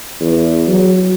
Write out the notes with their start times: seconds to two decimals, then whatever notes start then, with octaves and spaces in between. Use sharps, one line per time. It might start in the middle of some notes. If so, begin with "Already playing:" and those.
0.20 E2
0.67 F#3